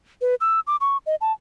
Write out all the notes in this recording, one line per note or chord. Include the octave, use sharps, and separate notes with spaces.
B4
E6
D6
C#6
D#5
A5